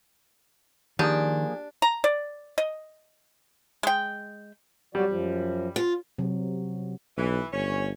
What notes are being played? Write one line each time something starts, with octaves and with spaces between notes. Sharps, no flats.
D#3 F3 A#3 D4 G4 G#4 G#5 G6
A#5
D5
D#5
G#3 G5
F#3 G3 F#4 D5
F#2 F3
F4
C3 F#3
B1 E3
G1 C#4 C#5